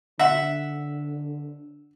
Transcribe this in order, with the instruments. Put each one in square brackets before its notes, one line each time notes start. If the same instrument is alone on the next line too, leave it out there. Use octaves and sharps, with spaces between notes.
[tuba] D3 [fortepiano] E5 F#5